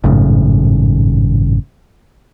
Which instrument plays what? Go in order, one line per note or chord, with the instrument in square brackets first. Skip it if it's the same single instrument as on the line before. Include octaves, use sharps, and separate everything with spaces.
[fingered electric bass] G#1 F#2 A2 C#3